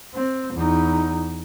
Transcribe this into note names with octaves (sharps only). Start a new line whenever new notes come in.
C4
E2 D#4